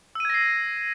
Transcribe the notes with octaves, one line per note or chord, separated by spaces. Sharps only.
E6 G#6 A#6 C7 D#7